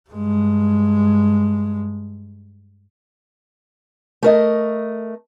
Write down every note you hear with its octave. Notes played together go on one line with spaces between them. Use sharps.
G2 G#3
A3 A#4 D#5